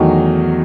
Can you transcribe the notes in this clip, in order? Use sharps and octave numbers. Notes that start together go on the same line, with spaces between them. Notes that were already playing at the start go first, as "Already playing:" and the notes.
Already playing: E2 D#3 F#3 A3 D#4 F#4